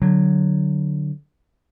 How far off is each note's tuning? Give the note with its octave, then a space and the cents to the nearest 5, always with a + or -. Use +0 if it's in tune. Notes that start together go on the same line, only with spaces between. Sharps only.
D3 +10 F#3 +0